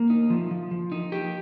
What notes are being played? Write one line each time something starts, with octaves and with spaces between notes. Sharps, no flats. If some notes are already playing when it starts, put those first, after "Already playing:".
Already playing: A#3
D#4
F3
F3
F3
D#4
G4